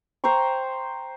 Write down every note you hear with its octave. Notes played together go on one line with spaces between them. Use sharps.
C5 G5 A#5 C#6